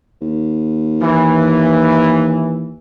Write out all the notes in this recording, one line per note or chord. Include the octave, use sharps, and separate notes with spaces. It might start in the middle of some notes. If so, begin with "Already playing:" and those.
D#2
E3